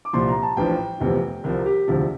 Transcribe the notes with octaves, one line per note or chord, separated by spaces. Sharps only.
D6
C2 A#2 F3 C6
A#5
A5
A1 G2 F3 G5
F1 E2 C3 F3
C2 C3 F3 A#4
G4
E1 D2 C3 F3